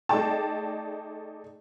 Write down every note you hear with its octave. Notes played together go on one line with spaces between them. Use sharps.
A3 D#4 G#4 D5 G5 A5